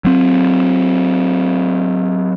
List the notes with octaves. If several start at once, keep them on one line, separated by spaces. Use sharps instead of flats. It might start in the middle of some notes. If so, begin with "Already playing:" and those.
F#3 C4